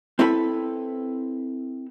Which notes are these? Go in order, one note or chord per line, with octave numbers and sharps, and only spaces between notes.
C4 E4 A4 B4 B5